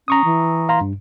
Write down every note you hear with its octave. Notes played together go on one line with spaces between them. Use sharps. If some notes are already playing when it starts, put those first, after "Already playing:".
C#4 A#5 C#6 D#6
E3
F5 A#5 C6
G2